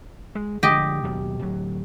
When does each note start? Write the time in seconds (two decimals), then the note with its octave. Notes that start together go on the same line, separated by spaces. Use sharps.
0.35 G#3
0.63 D3 F3 G#3 G4 D#5
1.03 D#2 B2 F#3
1.40 D1 F#3